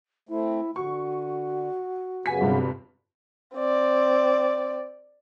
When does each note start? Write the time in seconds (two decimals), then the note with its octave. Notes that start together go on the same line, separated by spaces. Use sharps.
0.29 A3 C4 E4
0.76 D3 F#4 C#6
2.26 F#2 C#3 B3 G#5 B6
2.41 G1 G2 C3
3.56 C4 D5